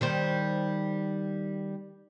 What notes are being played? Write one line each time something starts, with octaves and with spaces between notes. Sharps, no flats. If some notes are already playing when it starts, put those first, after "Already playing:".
D#3 G3 C5